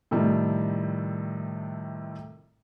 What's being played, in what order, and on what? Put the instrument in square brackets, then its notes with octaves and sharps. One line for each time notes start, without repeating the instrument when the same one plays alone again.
[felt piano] A2 C3 D#3 F3 G3 A3